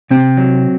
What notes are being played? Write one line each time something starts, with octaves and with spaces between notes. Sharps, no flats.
C3 C4
F#3